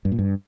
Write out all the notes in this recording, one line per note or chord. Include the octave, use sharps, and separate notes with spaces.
G2
A#2
G2